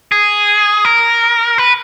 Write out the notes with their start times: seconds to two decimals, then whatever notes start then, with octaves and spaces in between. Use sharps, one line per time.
0.12 G#4
0.85 A#4
1.58 B4